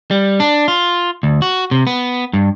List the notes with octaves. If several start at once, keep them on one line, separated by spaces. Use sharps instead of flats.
G3
D4
F4
D2
F#4
C3
B3
G2